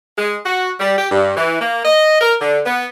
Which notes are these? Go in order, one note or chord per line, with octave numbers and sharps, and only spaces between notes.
G#3
F#4
G3
G4
G2
E3
A#3
D#5
A#4
D3
B3